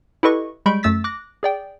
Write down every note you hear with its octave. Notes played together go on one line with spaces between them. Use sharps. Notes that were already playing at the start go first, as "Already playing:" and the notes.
E4 G4 A4 B4 D#5 C#6
G3 G#3 B5 C#6 G6 D7
F#2 A3 E6 A6 B6
D6 F#6 A#6
G#4 D5 G5